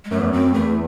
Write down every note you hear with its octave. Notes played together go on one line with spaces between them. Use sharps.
G#3
F#2 A3
E2
F#2
C4
E2 A3